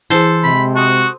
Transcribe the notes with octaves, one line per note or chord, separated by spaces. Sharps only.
E3 G#4 A4 C5
C3 G#3 B5
F#4 A5 D#6